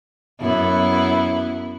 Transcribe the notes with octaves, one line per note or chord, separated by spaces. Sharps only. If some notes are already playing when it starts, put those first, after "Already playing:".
F#2 B3 E4